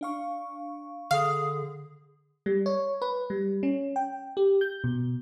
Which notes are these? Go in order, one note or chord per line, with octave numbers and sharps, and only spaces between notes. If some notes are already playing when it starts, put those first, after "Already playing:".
D4 F5 C#6
D3 G#4 F5
G3
C#5
B4
G3
C#4
G5
G4
G6
B2